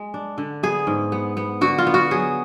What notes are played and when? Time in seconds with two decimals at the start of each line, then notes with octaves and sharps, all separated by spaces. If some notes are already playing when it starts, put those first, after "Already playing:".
Already playing: G#3
0.14 D4
0.38 D3
0.63 B3 G#4
0.87 G#2
1.12 B3
1.37 B3
1.61 D3 F#4
1.78 F4
1.87 B3
1.94 F#4
2.11 F#3 G#4